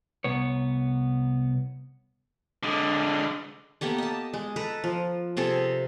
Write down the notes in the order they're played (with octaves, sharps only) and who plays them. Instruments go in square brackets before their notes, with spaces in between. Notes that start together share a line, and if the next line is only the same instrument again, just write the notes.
[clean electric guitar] C2 B3 C#5
[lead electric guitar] D3 G#3
[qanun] A#3 B3 G4 A4
D#5 A5
G#3
A4 B4 A#5
F3
C3 C4 G#4 A4